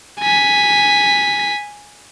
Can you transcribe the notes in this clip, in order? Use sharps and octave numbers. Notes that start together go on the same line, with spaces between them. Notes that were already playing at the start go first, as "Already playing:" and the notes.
G#5 B6